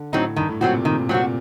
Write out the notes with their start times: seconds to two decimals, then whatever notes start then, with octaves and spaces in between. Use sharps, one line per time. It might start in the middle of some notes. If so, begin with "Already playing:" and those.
Already playing: D3
0.13 A2 F#3 C4 D#4
0.36 G2 D#3
0.49 A2
0.61 A#2 F#3 C4 F#4
0.73 C3
0.85 C3 D#3
1.09 A#2 F#3 C4 F#4